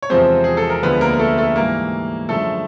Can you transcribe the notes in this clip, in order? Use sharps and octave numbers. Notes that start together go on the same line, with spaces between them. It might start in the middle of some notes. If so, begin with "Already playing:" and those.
C#5
E2 C3 F3 G#3 C4 C5
G#4
A4
A#4
D2 D3 F3 G#3 B3 B4
A#3 A#4
A#4
A3 A4
A3 A4
G#2 E3 G3 A#3 A#4
F#2 D3 F3 G#3 A3 A4